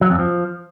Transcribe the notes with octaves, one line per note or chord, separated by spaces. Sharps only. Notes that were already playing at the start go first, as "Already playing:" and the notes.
F#3
F2
F3